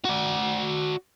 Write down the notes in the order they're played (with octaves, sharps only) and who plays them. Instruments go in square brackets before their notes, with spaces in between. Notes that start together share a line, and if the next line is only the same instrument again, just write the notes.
[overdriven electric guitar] F#4 D5